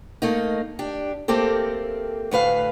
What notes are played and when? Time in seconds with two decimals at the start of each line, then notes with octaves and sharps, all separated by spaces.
0.22 A3 A#3 D#4
0.79 D4 G4
1.28 A3 A#3 C4 G4 A4
2.31 D2 A2 B4 F5